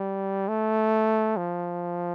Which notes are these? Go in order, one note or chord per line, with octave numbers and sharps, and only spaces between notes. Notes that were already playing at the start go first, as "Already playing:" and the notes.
Already playing: G3
A3
F3